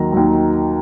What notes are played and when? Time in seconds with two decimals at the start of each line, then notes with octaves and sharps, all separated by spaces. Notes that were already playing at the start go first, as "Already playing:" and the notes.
Already playing: D#2 D#3 F#3 A#5
0.12 D#2 D#3 F#3